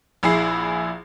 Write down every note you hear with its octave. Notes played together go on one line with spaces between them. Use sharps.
A#1 E4 G#4 C7